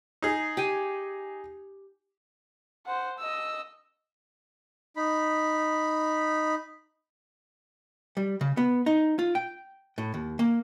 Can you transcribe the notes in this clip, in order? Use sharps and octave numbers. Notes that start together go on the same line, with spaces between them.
D#4 G#4
G4 G#5
C5 F#5
D#5 E6
D#4 B5
G3
C#3
B3
D#4
F4
G5
A2
D#2
A#3